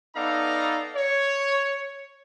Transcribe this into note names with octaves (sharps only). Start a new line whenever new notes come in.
B3 D#4 A4 D5 F5 A#5
C#5